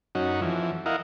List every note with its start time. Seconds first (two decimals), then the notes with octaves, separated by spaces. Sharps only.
0.15 F#2 C#4 D#4 F#4
0.41 F2 E3
0.86 E4 A#4 D#5 F5 F#5